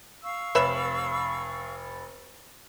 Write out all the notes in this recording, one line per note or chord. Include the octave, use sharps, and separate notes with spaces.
F5 C#6 E6
F1 B4 C#5 E5 B5 E7